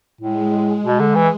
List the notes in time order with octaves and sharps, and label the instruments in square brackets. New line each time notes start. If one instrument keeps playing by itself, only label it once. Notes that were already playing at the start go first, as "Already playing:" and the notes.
[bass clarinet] A2 [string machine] G#3
[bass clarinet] B2
D3
E3